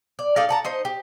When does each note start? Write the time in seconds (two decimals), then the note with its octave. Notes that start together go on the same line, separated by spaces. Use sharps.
0.19 D5
0.36 D#4 A4 D5 F5
0.49 F#5 A5 A#5
0.65 D#4 C5 D#5
0.85 G4